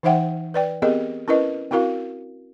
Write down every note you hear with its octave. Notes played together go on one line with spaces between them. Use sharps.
E3 D#4 C5 E5 F#5 G5
B4 D5 G5
B3 C4 G4 G#4 A#4 D#5
C#4 E4 A#4 B4 D#5
C4 E4 F#4 A#4 F5